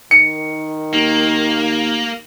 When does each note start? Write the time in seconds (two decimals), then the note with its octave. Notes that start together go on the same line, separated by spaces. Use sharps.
0.11 D#3 C#7
0.93 D#2 A#3